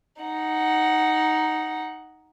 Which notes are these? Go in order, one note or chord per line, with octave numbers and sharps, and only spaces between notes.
D#4 F#5